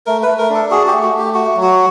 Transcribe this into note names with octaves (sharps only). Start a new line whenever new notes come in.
A3 A#4
A3 B4
A#4
D4
A4
F#4 G#4
G4
A3
F#4
A3 G4
F#4
F#3
F#4